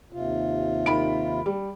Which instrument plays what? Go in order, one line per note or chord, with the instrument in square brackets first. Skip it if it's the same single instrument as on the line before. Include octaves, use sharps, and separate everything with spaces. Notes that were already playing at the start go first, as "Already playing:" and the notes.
[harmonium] D#2 C3 F4
[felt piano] D#3 B5 D7
G3